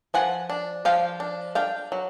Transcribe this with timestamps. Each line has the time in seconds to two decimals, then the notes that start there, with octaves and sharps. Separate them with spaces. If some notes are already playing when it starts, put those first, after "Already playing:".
0.14 F3 F#5 G#5
0.50 D4
0.85 F3 F5 G5
1.20 D4
1.55 D4 F5 G5
1.92 F#3